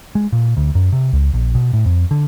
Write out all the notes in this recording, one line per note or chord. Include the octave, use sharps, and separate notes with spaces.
G#3
A#2
D2
F#2
C3
C#2
A#1
B2
A2
F2
D3